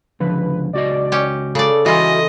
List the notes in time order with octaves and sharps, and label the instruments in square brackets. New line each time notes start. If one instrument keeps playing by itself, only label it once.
[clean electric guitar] C#2 D3 F3 [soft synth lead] B4
[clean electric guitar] C#2 F#4 D#5 [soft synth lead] D5
[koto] C#4 G4
[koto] C#3 D5 [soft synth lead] A4
[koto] E3 F4 [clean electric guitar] F#4 E5 G#5 [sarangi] D#5